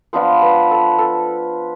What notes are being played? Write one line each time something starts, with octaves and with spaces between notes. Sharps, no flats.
F3 B3 D4 F4 C5
B4
A4
A4